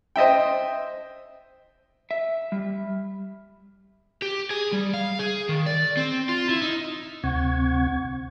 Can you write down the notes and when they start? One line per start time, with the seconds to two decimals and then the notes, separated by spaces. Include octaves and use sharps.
0.16 C5 D#5 E5 G5
2.11 E5
2.52 G3
4.22 G4
4.50 G#4
4.72 G3
4.94 F5
5.19 G#4
5.49 D#3
5.66 D5
5.97 C4
6.29 F4
6.49 E4
6.62 D#4
7.24 D2 C3 C4 F#5 C#6 G#6